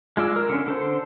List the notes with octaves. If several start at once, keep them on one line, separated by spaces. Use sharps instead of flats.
G#3 F4 D5 E6
A#4
D3 C#4
D3 A4 C5